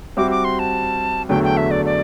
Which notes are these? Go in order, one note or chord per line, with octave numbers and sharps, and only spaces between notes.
G3 C4 F#4 C5 E5 D6
D6
C6
A5
E2 D3 F#3 A3 G5
G5
E5
D5
D5